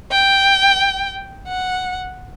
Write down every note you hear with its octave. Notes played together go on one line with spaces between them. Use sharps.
G5
F#5